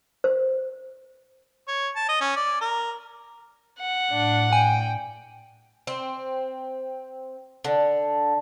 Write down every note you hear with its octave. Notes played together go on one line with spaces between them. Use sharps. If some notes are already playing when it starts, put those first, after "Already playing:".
C5
C#5
A5
D#5
C#4
D5
A#4
F#5
A2 D4
G5 G#5
C4
D3